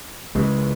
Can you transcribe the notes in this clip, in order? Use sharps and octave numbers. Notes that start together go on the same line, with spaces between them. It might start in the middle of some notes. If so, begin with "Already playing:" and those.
C#2 C#3 E3 G#3